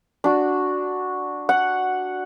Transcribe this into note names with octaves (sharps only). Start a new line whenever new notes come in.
D4 F#4
F#5